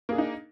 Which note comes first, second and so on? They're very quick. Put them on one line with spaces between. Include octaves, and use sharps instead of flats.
A#3 G#4 D4 D#4